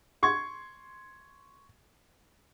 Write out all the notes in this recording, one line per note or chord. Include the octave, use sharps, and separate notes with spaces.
C6 C#6 G#6